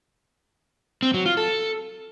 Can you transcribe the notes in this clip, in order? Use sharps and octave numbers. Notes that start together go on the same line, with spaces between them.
C4
F#3
F4
A4